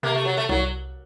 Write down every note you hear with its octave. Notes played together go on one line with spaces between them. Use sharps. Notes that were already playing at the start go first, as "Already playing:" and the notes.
C3 A#3
A3
F#3
A3
C2 F#3